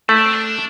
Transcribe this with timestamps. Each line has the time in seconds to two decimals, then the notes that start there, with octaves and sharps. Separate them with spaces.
0.09 A3 E4
0.17 D4
0.25 C4
0.33 D4